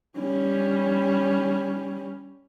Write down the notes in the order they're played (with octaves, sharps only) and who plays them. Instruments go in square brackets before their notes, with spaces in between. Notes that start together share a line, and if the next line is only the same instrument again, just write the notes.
[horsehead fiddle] G3 C#4